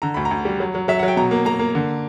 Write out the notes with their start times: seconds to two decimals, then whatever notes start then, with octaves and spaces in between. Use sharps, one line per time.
0.02 D3 A#5
0.14 D2 B5
0.25 A#5
0.31 D2
0.45 G3
0.60 F#3
0.75 F#3
0.88 F#3 E5
0.99 F#3 F#5
1.08 G5
1.16 B2 A#5
1.31 A#3
1.45 A#3 A#5
1.59 A#3
1.75 D3